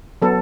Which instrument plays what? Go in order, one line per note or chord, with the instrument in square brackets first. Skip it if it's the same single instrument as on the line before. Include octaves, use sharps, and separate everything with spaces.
[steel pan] F#3 B3 A4